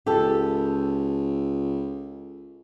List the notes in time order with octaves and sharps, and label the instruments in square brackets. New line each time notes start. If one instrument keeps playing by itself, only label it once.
[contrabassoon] C#2 [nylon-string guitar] G4 A4